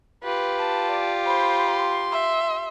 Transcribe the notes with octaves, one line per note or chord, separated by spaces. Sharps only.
F4 G4 B4
A5
D5
C5 B5
C6
E5